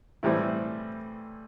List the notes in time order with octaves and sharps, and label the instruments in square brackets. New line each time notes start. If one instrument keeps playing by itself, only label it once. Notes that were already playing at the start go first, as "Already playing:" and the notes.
[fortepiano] A2 E3 G3 C4 E4